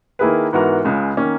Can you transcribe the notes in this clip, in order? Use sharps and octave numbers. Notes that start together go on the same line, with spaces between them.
D#3 A#3 E4 G#4 B4
G#2 E3 B3 F#4 A#4
C#2 C#3 G#3
D#3 A#3 C#4